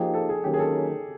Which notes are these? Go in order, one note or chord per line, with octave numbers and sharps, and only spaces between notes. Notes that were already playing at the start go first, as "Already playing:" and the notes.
Already playing: F3 A#3 D#4 G4 G#4
A4
G#4
D#3 F#3 A#3 C#4 G4
G#4
A4